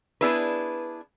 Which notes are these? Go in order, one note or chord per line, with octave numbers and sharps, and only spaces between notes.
B3 D4 E4 G#4 B4